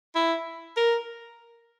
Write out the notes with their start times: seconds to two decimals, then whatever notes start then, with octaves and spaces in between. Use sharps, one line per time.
0.15 E4
0.77 A#4